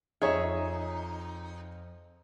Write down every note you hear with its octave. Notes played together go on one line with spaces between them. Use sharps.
F2 D#4 G#4 C#5 E5